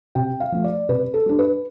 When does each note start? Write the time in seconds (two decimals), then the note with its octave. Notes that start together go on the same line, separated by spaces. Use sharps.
0.15 C3 G5
0.40 F5
0.52 F3 A3
0.64 D5
0.89 C3 B4
1.14 A4
1.26 G3 D4
1.39 B4